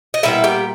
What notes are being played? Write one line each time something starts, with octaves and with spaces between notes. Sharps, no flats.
D#5
A#2 G3 B3 E4 E5
G4 G5